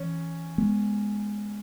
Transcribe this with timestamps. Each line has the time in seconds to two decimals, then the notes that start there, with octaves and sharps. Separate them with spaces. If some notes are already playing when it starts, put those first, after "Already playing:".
Already playing: E3 C#4
0.58 G#3 B3